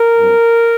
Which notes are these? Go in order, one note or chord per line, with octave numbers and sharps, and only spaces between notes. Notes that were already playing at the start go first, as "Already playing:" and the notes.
Already playing: A#4
G2 F#3 C4